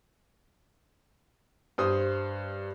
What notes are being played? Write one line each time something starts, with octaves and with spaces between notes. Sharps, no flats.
G2 C5 D#6